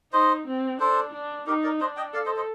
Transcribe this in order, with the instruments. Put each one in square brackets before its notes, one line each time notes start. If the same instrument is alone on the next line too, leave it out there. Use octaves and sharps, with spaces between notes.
[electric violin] D#4 [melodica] C5 D#5
[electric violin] C4
[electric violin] D4 [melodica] A4 C5
[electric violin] D4
[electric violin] D#4 [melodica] G4 A#4
[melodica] A#4 D5
[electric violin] D4 [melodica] C5 D#5
[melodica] D#5 G5
[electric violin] A4 [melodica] D5 F5
[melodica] C5 D#5
C5 D#5